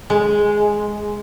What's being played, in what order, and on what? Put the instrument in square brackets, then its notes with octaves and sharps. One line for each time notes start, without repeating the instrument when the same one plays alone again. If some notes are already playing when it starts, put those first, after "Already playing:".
[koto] G#3